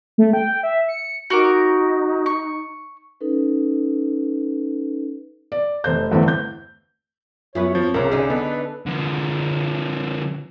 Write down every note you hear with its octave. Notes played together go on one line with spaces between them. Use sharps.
A3
G5
E5
C#7
D#4 F#4 A#4 D6
C#6
C#4 D#4 A4 B4
D5
F1 C5 G6
E2 G2 D3 E3 A3 C4
G6
F#2 B3 F4 B4 C#5 E5
F3 C4
C2 C#3 A#3 C4 C#4 A#4 A#5
D3 D#4 G#4 D#5
B3 A4 B4
D3 F3